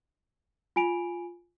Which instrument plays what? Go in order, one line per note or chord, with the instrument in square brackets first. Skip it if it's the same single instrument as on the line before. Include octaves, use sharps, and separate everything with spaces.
[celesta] F4 G#5 D7 F7